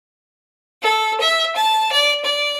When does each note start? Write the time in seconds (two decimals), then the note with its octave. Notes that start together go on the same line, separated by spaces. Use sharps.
0.82 A4
1.21 E5
1.56 A5
1.92 D5
2.25 D5